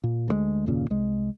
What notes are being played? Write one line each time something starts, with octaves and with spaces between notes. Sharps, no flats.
A#2
D2 F3 G#3
F#1 D#2 A#2 C#3
C2 G#3